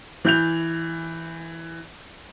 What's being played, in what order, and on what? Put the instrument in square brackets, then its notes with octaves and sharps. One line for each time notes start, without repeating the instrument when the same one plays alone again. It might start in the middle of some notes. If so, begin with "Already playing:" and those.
[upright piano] E3 G6 F7